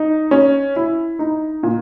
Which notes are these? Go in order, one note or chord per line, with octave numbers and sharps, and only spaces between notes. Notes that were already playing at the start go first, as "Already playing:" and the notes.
Already playing: D#4
C#4
E4
D#4
A#2